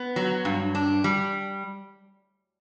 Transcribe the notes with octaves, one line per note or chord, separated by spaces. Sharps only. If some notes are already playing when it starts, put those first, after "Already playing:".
Already playing: B3
F#3
G2
D4
G3